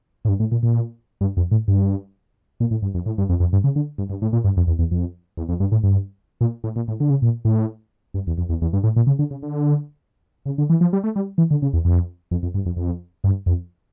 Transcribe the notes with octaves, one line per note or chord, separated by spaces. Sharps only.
A2
G2
A2
A#2
A#2
G2
F2
A2
G2
A#2
A2
G2
F2
A2
G2
F2
F2
G2
C#3
D3
G2
G2
A2
A#2
G2
F2
E2
E2
F2
E2
F2
G2
A2
G2
A#2
A2
A#2
A2
D3
C#3
A#2
A2
G2
E2
F2
E2
E2
G2
A2
A#2
C#3
D3
C#3
D3
C#3
D3
E3
F3
G3
A3
G3
E3
D3
C#3
E2
F2
F2
F2
G2
F2
F2
G2
F2